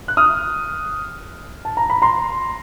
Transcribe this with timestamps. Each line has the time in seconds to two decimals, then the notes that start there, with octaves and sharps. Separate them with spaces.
0.08 F#6
0.17 D#6 F6
1.65 A5
1.77 A#5
1.90 B5
2.02 A#5 C6